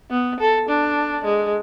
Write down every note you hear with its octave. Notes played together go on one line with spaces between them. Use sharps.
B3
A4
D4
G#3